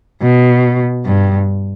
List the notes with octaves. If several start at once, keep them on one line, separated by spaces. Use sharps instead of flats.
B2
G2